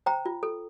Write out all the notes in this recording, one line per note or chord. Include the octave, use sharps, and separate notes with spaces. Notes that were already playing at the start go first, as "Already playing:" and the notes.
C5 G5 A#5
F4
A4